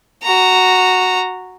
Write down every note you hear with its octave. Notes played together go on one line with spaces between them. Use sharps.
F#4 A#5